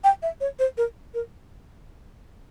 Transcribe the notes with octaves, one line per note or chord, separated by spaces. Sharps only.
G5
E5
C#5
C5
A#4
A#4